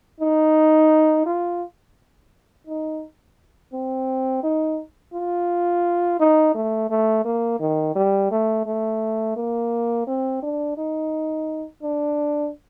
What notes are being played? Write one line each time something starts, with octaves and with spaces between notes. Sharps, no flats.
D#4
F4
D#4
C4
D#4
F4
D#4
A3
A3
A#3
D#3
G3
A3
A3
A#3
C4
D4
D#4
D4